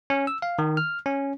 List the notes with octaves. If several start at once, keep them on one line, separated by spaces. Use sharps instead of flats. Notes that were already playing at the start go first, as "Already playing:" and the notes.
C#4
E6
F5
D#3
F6
C#4